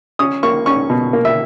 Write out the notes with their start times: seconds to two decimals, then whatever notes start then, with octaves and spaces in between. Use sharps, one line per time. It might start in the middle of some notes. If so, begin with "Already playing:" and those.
0.19 C#4 D#6
0.43 A#3 C#6
0.66 C#4 C#6
0.90 B2
1.13 A#3
1.25 E5